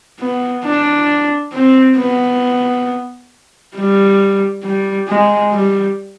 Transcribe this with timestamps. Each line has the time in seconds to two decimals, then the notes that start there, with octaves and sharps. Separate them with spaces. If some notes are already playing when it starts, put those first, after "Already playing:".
0.20 B3
0.65 D4
1.53 C4
1.97 B3
3.76 G3
4.63 G3
5.08 G#3
5.52 G3